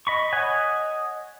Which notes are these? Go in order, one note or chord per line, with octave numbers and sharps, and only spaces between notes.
D#5 B5 C#6
C#5 D#5 F#5 G#5